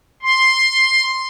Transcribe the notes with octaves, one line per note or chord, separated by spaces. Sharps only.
C6